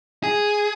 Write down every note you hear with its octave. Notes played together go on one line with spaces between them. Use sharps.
G#4